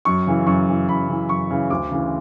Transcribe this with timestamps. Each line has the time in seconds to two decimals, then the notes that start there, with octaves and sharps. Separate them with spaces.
0.05 F#2 C#6
0.27 C#3 E3
0.46 F#2 C#6
0.68 C#3 E3
0.88 F#2 B5
1.09 C#3 E3
1.29 F#2 C#6
1.50 C#3 E3
1.70 D2 D6
1.91 C#3 E3